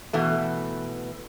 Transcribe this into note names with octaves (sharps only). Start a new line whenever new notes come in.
B2 E3 A3